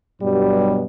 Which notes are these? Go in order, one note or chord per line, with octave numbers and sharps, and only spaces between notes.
G2 B2 F#3 G3